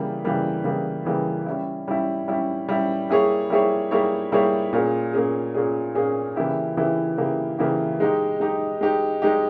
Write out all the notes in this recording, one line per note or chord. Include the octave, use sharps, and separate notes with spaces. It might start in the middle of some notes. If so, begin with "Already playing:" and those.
Already playing: C#3 E3 G3 A#3
C#3 E3 G3 A#3
C#3 E3 G3 A#3
C#3 E3 G3 A#3
G3 C#4 E4
G3 C#4 E4
G3 C#4 E4
G3 C#4 E4
G3 A#3 E4 G#4 C#5
G3 A#3 E4 G#4 C#5
G3 A#3 E4 G#4 C#5
G3 A#3 E4 G#4 C#5
A#2 A#3 C#4 G#4
A#2 A#3 C#4 G#4
A#2 A#3 C#4 G#4
A#2 A#3 C#4 G#4
C#3 E3 A#3 E4 G4
C#3 E3 A#3 E4 G4
C#3 E3 A#3 E4 G4
C#3 E3 A#3 E4 G4
G#3 D#4 G4
G#3 D#4 G4
G#3 D#4 G4
G#3 D#4 G4